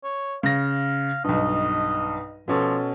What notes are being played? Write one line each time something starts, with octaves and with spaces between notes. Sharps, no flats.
C#5
C#3 F5 A#6
B1 G2 D#5
B2 F3 C#4 A4